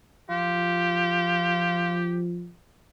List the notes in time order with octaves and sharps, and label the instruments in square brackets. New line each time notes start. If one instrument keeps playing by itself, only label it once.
[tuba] F3 [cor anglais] F4 [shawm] G4